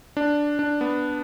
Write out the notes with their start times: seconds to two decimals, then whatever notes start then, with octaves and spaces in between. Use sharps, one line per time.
0.17 D4
0.59 D4
0.81 B3